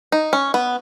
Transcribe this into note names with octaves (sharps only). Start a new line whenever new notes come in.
D#4
C#4
B3